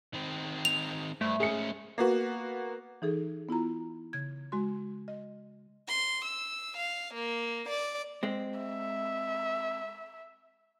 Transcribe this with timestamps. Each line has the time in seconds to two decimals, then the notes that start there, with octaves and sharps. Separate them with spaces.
0.14 D#3 C4
0.65 F7
1.21 G2 A3 C5
1.40 G#2 C#4 G#4 C#7
1.98 A#3 B3 F#4
3.02 E3 D#4 G#4 A4
3.49 B3 E4 F4 A#5
4.13 C#3 G#6
4.52 G#3 F#4 C6
5.08 D#5
5.88 C6
6.25 E6
6.77 F5
7.14 A#3
7.69 D5
8.23 G#3 C4
8.60 E5